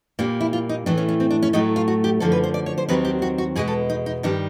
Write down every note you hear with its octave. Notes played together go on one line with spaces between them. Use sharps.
A#2 G3 A#3 D4
E4
F4
D#4
A2 E3 A3 D4
C#4
C#4
C4
D4
C#4
A2 F#3 A3 D#4
F4
F#4
G4
F#2 D3 F3 A4
B4
C5
D5
C#5
C5
D#2 D#3 F#3 C4 B4
G4
F#4
F#4
E2 B2 G#3 G#4
A4
D#4
D#4
G2 D#3 G3 D4